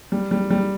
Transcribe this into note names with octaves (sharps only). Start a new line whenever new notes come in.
G3
G3
G3